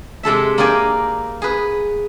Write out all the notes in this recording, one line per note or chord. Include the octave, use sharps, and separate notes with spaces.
C3 G#3 A4 E5
A#3 D#4 D5 G5 G#5
G#4 B4